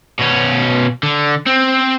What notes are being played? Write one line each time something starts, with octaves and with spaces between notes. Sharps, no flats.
B2 C#4
D3
C4